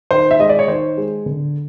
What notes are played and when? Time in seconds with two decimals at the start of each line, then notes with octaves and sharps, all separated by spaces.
0.11 D#3 C5
0.31 E5
0.39 G#3 D#5
0.49 D5
0.59 C#5
0.68 D#3 C5
0.97 G#3
1.26 D3